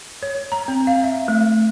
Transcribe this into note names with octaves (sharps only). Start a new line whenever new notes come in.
C#5
A#5
C4
F5
E5
A3